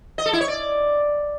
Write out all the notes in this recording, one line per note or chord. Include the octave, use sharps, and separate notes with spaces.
D#5
A4
E4
C#5
D5